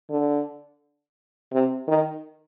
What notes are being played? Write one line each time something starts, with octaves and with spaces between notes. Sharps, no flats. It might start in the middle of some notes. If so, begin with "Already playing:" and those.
D3
C3
D#3